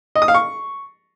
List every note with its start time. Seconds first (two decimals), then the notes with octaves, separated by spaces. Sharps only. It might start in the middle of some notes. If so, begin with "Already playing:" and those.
0.15 D#5
0.22 D#6
0.28 F5
0.34 C#6